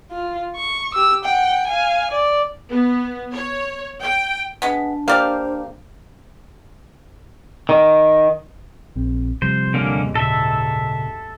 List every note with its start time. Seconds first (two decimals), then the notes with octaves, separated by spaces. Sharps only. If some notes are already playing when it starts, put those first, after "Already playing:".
0.11 F4
0.56 C#6
0.95 G4 E6
1.25 F#5 G5
1.67 F5 G#5
2.12 D5
2.70 B3
3.33 C#5
4.01 G5
4.62 G#3 B3 D4
5.08 A#3 G4 C5 D5 F5
7.69 D#3
8.96 A#1 C4
9.42 C3 F3 G3 C5
9.74 D#2 G#2 D3 A#3 C#4
10.15 A#2 C#3 A4 E5